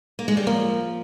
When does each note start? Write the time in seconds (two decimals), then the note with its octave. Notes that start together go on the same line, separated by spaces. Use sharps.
0.19 A#3
0.28 G#3
0.37 G3
0.47 F3 A#3